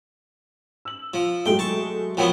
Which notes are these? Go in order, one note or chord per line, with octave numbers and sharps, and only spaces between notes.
E6 F#7
F3
F#3 G#3 A3 G5
A5 C#6
F3 F#3 B3 A#4 F#5 G5